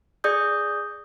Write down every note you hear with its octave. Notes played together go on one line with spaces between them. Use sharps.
G#4 D5 D#6 G6